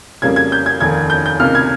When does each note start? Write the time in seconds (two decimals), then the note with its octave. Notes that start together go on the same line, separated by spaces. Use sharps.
0.22 F2 C#3 G3 A#3 G#6
0.36 G#6
0.52 G6
0.66 G#6
0.81 F1 D#2 D#3 A#3 G#6
1.10 G6
1.26 G6
1.40 C#2 C3 D#3 A#3 F6
1.55 G#6